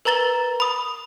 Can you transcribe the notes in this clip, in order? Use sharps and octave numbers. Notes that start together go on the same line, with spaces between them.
A#4 B4 A#5 A6 G7
B5 D#6